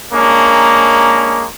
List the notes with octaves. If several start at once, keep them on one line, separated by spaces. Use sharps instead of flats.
G#3 A#3 C#4 D4 A#5